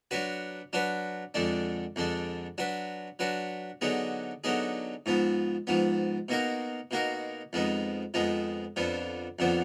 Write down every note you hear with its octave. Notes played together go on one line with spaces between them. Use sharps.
F#3 D4 F#4 B4
F#3 D4 F#4 B4
F2 D3 G#3 D4
F2 D3 G#3 D4
F#3 D4 F#4 B4
F#3 D4 F#4 B4
D3 F#3 B3 D#4 G#4
D3 F#3 B3 D#4 G#4
G#2 F3 B3
G#2 F3 B3
B2 A#3 D#4 F#4 A#4
B2 A#3 D#4 F#4 A#4
F2 F3 G#3 B3 D#4
F2 F3 G#3 B3 D#4
F2 D3 F3 B3
F2 D3 F3 B3